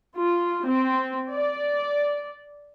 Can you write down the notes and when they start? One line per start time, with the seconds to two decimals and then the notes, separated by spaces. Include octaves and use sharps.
0.17 F4
0.67 C4
1.32 D5